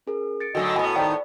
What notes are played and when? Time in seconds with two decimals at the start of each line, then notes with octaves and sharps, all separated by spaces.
0.07 C#4 G#4 A#4
0.40 A6 C#7 D7
0.55 D3 D#3 F#3 A3 F#4 D#5 G#5
0.76 A2 B3 G#5 B5
0.96 D#3 D#4 C5 D5 G5